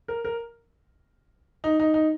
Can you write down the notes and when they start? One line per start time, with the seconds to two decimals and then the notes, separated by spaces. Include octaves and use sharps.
0.08 A#4
0.25 A#4
1.64 D#4
1.80 D#4
1.94 D#4